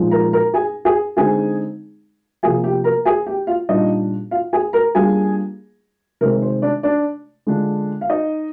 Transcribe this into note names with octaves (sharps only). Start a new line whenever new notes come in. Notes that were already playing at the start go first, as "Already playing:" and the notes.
Already playing: A#2 F3 G#3 D#4
A#4 A#5
A#4 A#5
G#4 G#5
G#4 G#5
D3 G#3 C4 D#4 G#4 G#5
C3 F3 A#3 G#4 G#5
G4 G5
A#4 A#5
G#4 G#5
G4 G5
F4 F5
A#2 G3 D4 D#4 F4 D#5
F4 F5
G#4 G#5
A#4 A#5
G3 A#3 D4 F4 G#4 G#5
C3 D#3 G#3 C4 A#4
C5
D4 D5
D4 D5
D3 G#3 D4 F4
F5
D#4 D#5